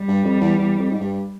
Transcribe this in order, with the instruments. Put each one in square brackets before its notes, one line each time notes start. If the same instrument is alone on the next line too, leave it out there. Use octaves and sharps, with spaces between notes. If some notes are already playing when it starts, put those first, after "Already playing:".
Already playing: [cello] G3
[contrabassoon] G2
F2
E2
E2
F2
G#2
G2